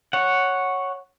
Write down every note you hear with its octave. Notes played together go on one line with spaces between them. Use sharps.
C#5 F#5